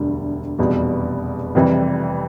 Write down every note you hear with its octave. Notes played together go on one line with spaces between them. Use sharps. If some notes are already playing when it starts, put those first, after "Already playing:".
Already playing: E1 D2 D3 G3
F1 E2 B2 G3
F1 F2 C3 E3 G3